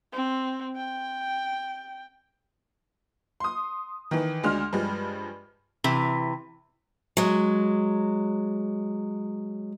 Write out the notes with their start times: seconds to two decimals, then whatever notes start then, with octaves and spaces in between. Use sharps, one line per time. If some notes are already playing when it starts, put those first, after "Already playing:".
0.12 C4
0.76 G5
3.40 C6 D#6
4.11 D#3 E3
4.43 D2 G#3 D4 C6 F6
4.73 G2 F3 G3 G#3
5.84 C3 E3
7.17 F#3 G#3